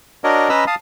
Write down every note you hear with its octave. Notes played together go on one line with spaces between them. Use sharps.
D4 F#4 A#4 C#5 D#5
C#4 B4 D#5 A#5 B5 E6
F5 A5 D#6